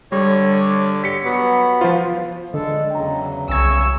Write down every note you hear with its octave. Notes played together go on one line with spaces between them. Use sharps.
D3 G3 C#5
G4 B6 C#7
F#3 B3
F3 F4 C5
D3 G#3 D4 A4 D#5
E2 C#3 F#3 G5 A#5
C2 G#5 C#6 D#6 E6 G#6